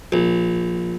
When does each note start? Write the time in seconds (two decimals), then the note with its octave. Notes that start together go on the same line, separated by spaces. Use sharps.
0.12 A#1